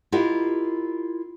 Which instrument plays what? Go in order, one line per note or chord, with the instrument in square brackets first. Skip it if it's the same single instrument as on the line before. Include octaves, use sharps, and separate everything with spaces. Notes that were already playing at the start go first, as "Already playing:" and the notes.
[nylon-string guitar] E4 F4 G4 A#4 D#5 F#5